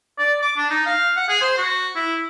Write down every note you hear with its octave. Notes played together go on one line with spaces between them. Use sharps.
D5
D6
D4
D#4
F5
F#5
G#4
C5
F#4
E4